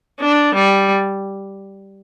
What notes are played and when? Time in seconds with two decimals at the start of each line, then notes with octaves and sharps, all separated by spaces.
0.21 D4
0.55 G3